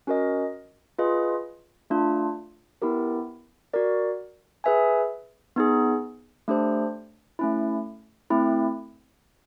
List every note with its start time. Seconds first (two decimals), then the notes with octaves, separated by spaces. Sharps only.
0.07 C#4 F#4 A#4 D#5
0.99 F4 G#4 B4 D#5
1.90 A3 D4 F4
2.82 B3 E4 G4 A#4
3.74 F#4 A#4 D5
4.64 G#4 B4 E5 G#5
5.56 B3 D#4 G#4
6.48 A3 D4 G4 C5
7.39 A3 C#4 E4
8.30 A3 C4 E4